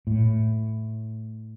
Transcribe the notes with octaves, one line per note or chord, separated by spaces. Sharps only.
A2